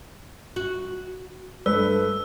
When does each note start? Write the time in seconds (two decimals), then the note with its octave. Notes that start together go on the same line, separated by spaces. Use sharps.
0.56 F#4
1.66 G2 A3 B4 E6